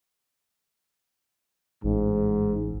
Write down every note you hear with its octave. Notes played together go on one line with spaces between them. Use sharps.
A1 G#2